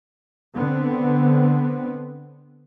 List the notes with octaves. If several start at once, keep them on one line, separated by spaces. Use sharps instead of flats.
D3 B3 C4